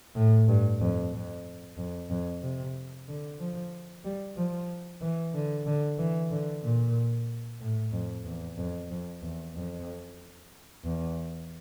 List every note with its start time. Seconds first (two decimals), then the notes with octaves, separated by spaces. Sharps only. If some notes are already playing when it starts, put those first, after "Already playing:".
0.15 A2
0.49 G2
0.81 F2
1.13 F2
1.78 F2
2.10 F2
2.43 C3
3.08 D3
3.39 F3
4.04 G3
4.37 F3
5.01 E3
5.34 D3
5.66 D3
5.98 E3
6.31 D3
6.63 A#2
7.61 A2
7.93 F2
8.25 E2
8.57 F2
8.91 F2
9.22 E2
9.55 F2
10.85 E2